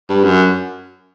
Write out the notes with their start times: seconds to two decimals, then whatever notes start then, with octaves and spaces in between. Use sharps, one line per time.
0.09 G2
0.24 F#2